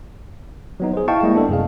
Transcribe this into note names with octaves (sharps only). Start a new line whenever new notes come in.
F#3 B3 D#4
G#4 C5
E4 D#5 F5 G5 A5 C#6
G3 G#3 A#3 E4 D#5 G5
B3 D4 A4
F#2 C3 G#4 F5